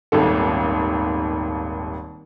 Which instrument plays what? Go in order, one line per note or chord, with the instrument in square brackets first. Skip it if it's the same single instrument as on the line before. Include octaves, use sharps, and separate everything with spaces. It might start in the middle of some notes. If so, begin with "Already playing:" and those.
[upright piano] D#1 G#1 D#2 A4